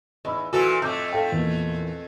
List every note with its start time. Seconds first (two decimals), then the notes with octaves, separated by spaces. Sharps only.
0.25 E2 D#5 B5 E6
0.53 A#2 E3 F#4 A4
0.82 F2 A3 D6 E6 G6
1.13 A4 F5 G5
1.32 E2 A#2